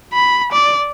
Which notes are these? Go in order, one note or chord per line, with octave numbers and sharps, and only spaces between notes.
B5
D5